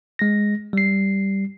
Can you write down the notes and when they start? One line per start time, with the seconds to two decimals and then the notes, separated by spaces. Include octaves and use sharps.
0.19 G#3 A#6
0.73 G3 C7